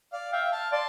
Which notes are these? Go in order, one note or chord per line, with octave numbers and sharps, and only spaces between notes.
D5 F5
E5 F5 G5
F5 A5
D5 A5 C6